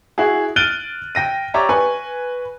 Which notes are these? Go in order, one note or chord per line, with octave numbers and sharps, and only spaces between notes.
E4 F#4 G#4
F6 F#6 A6 D7 D#7 G7
G5 A#6 D#7
G4 C#5 D5 E5 A#5
B4 G#5 C#6